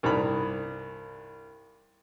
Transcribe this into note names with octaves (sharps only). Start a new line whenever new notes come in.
C2 G2 D#4 B5